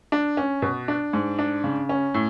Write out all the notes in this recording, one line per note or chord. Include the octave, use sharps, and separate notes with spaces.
D4
C#4
B2
D4
G#2
D4
C#3
C#4
A2